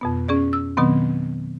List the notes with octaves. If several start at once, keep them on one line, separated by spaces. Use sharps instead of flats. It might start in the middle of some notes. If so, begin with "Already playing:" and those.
F2 B2 B3
C#4 G#4 D5
E6
B2 D#3 F#3 B3 C4